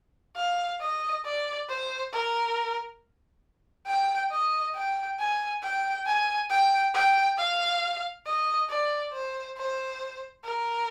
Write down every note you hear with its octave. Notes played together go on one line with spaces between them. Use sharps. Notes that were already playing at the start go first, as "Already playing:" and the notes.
F5
D#5
D5
C5
A#4
G5
D#5
G5
G#5
G5
G#5
G5
G5
F5
D#5
D5
C5
C5
A#4